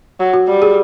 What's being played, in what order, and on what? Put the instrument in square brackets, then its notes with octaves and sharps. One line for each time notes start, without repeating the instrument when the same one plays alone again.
[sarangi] F#3
[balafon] F#4
[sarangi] G3
[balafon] G#4